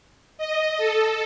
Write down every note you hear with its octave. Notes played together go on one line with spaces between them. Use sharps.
D#5
A4